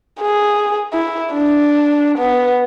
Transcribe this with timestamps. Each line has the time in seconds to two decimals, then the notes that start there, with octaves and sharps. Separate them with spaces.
0.21 G#4
0.94 E4
1.33 D4
2.18 B3